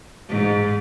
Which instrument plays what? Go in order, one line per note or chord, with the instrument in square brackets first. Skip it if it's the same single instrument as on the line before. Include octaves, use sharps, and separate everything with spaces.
[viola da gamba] G#2